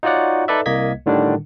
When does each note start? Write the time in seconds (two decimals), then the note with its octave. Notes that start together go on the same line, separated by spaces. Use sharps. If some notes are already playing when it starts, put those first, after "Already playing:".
0.03 D#4 F4 F#4 C#5 D5 F#5
0.48 D#4 A4 B4 D5 E5
0.66 C2 A#3 D#5 G#6 B6
1.06 A2 D3 D#3 G3 D4